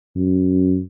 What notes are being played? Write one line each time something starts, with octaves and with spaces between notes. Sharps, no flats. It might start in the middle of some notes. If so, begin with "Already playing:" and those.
F#2